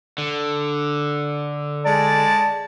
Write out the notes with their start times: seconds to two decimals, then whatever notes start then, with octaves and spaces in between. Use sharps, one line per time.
0.18 D3
1.85 G#3 G#4 D5 A5